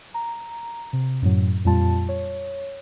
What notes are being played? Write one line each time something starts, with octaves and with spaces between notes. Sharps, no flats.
A#5
C3
F#2 A2 F#3
F2 A#2 G3 F4 A5
C#5